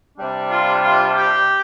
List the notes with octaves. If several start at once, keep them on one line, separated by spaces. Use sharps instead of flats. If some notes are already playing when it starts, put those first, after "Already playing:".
C3 G3 D4
F4
F4
G4